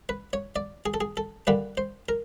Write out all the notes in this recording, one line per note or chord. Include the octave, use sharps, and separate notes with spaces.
B4
C#5
D5
G#4
A4
G#4
A4
D3 G3 A#3 B4
C5
A#4